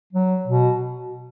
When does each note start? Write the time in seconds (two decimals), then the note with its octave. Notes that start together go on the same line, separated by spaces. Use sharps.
0.13 F#3
0.48 B2